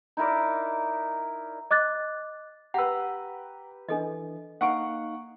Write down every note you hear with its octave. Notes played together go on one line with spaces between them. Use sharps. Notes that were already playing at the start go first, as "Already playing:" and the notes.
D#4 E4 A#4 D5
D#5 D6 F#6 A6
G4 B4 F#5 A#5 E6
E3 D4 A4 D#5
A#3 D#4 F5 F#5 C#6 D7